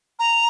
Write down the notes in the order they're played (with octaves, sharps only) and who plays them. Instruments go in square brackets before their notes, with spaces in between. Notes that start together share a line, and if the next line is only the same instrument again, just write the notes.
[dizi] A#5